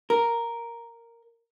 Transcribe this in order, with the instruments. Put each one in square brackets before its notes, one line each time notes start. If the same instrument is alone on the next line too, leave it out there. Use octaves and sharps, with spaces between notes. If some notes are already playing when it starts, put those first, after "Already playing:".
[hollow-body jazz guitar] A#4